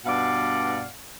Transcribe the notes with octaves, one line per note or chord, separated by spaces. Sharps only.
G2 B2 D5 F5 F#5